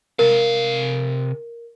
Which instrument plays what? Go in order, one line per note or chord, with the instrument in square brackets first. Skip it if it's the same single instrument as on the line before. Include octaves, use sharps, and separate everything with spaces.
[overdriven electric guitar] C3 F5 [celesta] A#4